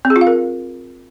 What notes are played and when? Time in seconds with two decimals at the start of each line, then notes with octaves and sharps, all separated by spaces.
0.05 C4
0.10 G#4
0.16 F4
0.21 F5
0.27 A#4